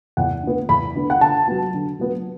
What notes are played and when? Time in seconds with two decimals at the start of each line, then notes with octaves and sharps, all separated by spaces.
0.17 E2 F#5
0.43 D3 B3
0.69 E2 B5
0.95 D3 B3
1.10 F#5
1.21 D3 A5
1.48 F#3 B3
1.74 D3
1.99 F#3 B3